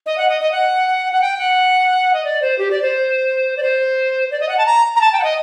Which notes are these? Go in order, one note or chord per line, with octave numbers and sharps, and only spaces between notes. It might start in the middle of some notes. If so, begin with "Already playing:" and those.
D#5
F#5
D#5
D#5
F#5
F#5
G5
F#5
D#5
D5
C5
G4
D5
C5
D5
C5
D5
D#5
F#5
A5
A#5
A#5
A5
G5
F#5
D#5